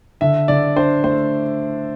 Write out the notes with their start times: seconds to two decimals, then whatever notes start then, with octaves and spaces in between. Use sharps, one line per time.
0.21 D3 E5
0.48 D3 D5
0.76 D4 C5
1.03 A3 C5